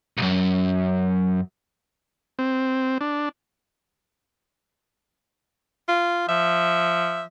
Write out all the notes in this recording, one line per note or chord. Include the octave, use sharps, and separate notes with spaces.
B1 F#2
C4
D4
F4
F3 E5